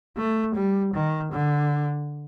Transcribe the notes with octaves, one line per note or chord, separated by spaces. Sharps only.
A3
G3
D#3
D3